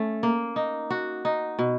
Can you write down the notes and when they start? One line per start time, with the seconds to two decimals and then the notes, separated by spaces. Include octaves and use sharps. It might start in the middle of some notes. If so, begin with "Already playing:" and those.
Already playing: A3 C#4
0.23 A#3
0.56 D#4
0.90 F#4
1.25 D#4
1.59 B2